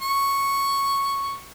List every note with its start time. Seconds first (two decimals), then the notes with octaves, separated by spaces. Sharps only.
0.02 C#6